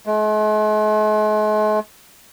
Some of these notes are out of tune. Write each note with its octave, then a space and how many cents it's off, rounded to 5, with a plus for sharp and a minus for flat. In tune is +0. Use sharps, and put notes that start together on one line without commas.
G#3 +45